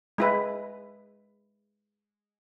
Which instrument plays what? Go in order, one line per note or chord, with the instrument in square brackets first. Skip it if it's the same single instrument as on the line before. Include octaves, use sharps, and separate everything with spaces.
[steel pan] G#3 E4 B4